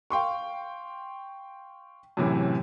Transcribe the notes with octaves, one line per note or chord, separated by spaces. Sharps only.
F5 G5 C6 C#6
F#2 A2 C3 E3